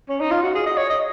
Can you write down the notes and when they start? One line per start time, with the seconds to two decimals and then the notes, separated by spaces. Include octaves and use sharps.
0.09 C#4
0.20 D#4
0.31 F4
0.43 F#4
0.55 G#4
0.66 D#5
0.77 C#5
0.90 D#5